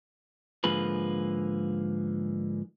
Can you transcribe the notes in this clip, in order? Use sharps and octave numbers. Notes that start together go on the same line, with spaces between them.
G#2 D3 F3 A#3 G#4 B4